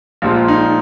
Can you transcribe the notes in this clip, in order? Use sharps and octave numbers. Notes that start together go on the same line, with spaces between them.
A#1 A#2 F3 G#3 F4
D#4